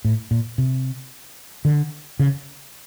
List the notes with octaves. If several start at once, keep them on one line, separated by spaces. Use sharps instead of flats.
A2
A#2
C3
D3
C#3